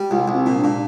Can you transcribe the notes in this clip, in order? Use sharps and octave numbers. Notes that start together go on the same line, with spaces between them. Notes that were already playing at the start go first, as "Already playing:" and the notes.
Already playing: G3
C2 F4
C2
C4
A#2
D4
A#2